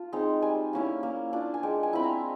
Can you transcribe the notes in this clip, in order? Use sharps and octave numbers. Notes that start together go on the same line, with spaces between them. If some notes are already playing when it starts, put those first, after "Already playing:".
Already playing: F4 A5
G#3 C4 D#4
G3 G#5
A#3 C#4 E4
A#3
D4 F4
G#5
G#3 G5
G#5
C4 E4 B5
A#5